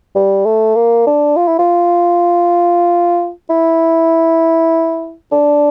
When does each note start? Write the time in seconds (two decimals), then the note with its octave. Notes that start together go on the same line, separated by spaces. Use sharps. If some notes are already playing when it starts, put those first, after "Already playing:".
0.15 G3
0.45 A3
0.75 A#3
1.06 D4
1.36 F4
1.47 E4
1.59 F4
3.49 E4
5.32 D4